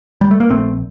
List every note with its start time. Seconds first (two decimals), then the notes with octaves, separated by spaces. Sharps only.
0.21 G3
0.31 A3
0.40 A#3
0.50 A#1 A3 C4